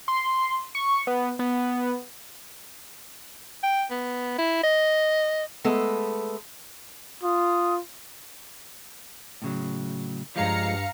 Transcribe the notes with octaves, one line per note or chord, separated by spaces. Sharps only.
C6
C#6
B3
B3
G5
B3
E4
D#5
G#3 A3 B3 A4
F4 D#6
A2 C#3 F#3
G2 F3 G#3 F5 A#5 C#7